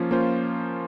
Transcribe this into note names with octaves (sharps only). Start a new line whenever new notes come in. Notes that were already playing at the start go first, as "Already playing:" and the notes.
Already playing: F3 A#3 C#4 F4
A#3 C#4 F4 C5